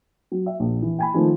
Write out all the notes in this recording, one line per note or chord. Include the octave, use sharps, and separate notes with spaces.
F#3
E5
A#1
E3
G5 G#5 B5
D#3 F3 A3